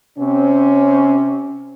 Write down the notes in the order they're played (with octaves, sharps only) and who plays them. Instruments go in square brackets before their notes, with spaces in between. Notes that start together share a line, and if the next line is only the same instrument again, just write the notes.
[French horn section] C3 C4 C#4